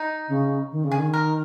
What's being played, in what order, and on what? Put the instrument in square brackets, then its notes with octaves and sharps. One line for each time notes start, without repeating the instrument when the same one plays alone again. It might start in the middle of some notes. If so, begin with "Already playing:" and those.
Already playing: [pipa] D#4
[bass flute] C#3
D#3
C#3
[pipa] G#4
[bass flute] D#3
[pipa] A#4